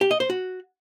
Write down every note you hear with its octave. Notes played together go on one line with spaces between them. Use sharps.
G4
D#5
C5
F#4